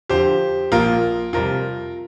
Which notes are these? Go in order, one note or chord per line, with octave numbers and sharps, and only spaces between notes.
F2 D3 F3 G4 C5
A#1 A#2 F3 A#3 F4 A#4
F2 C3 G3 F4 A#4